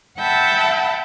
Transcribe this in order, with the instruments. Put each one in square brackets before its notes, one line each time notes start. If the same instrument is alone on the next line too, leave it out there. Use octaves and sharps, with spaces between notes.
[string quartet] E5 F#5 G5 A5 B5